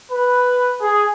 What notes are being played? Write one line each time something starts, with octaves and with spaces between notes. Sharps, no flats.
B4
G#4